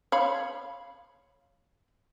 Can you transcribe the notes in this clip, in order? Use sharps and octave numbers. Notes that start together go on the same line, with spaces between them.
C#5 F5 B5